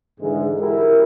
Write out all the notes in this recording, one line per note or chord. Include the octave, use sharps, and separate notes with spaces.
G#2 D3 E3 G#3
E4 F#4 G4 A#4